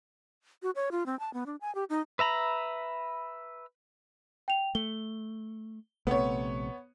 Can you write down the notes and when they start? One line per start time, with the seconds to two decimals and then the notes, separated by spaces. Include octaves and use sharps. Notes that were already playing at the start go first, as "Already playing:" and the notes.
0.63 F#4
0.76 C#5
0.92 F4
1.06 C4
1.19 A5
1.34 B3
1.46 D4
1.61 G#5
1.75 G4
1.90 D#4
2.19 B4 E5 A#5 B5
4.48 G5 F7
4.75 A3 G7
6.07 A#1 C3 A3 B3 C#5